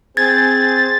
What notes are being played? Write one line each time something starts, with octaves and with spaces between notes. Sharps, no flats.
C4 G#4 C5 G#6 A6